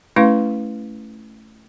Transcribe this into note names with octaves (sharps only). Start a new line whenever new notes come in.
A3 C#4 E4 B4 F5 C6